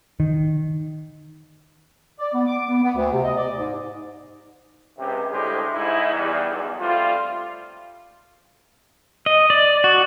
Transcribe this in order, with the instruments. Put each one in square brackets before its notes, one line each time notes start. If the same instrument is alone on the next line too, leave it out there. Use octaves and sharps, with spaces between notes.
[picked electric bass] D#3
[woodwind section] D5
B3
D6
B3
B3
D2
C3
D#5
D5
G#2
[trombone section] C#2 C3 G4
D2 A2 G3 G#3 G4 C5
G#2 D#4 E4
E2 G3
B1 E2
G3 A3 C4 F4
[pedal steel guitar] D#5
D5
F#4